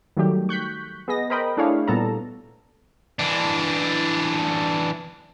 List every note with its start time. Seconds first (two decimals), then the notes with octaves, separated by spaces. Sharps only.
0.17 D#3 F#3 G3 A3 G4
0.49 C#6 F#6 G6 B6
1.08 B3 G#4 D#5 A#6
1.30 A#4 C5 D#5 G5 B5
1.57 A3 D4 E4 G#4 C#5 F5
1.88 A#2 G3 B3 A4 A5 A#5
3.19 E3 D4